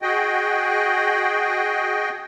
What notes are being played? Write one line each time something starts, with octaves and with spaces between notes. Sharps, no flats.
F#4 G#4 D#5 G5